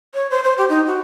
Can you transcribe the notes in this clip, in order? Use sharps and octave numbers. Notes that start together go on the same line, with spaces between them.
C#5
C5
C5
G4
D#4
F#4